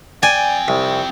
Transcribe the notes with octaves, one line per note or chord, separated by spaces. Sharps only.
F2 D5 G5 G#5
C2